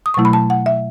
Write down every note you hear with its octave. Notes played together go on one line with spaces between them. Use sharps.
D#6
B2 F#3 A3 E4 C#6
B5
A5
F#5
E5